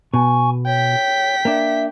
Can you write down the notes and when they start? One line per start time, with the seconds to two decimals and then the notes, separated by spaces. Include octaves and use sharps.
0.14 B2 G#5 C#6
0.66 C#5 G5 B6
1.45 A#3 D4 E5